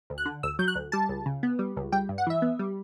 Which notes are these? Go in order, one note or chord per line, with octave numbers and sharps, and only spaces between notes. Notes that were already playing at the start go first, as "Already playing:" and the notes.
D2
F#6
D3
D2 E6
F#3 G6
F#6
D2
G3 A5
C#2
C#3
B3
G3
C#2
G3 G5
G2
F#5
E3 E5
B3
G3